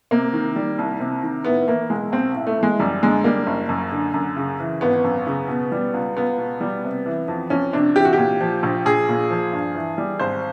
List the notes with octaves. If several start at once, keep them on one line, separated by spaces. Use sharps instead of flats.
C3 A#3
D#3
G3
C2
C3
D#3
A2 B3
E3 A#3
B1 G#3
B1 C4
A2
A3
E3
G#3
F#2 G3
D3 G#3
G3 A#3
F#1
F#2
D3
F#2
C#3
E3
G#1 B3
F#2
C#3
B2
G3
C#2
C#2 B3
B2
G3
C3
E3
F2
F2 C#4
C3 D4
E3 G4
F#4
A#2 G4
F3
A#1
A#1 G#4
A#2
F3
G2
E3
G3
G#1 C5